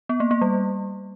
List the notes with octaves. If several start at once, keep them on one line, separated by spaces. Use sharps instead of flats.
B3
A#3
A#3
G3